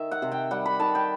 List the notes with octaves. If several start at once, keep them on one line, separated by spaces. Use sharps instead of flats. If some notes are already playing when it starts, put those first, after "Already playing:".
Already playing: D#3 E5
F#5
C3
G5
G3 F#5
B5
D#3 A5
G5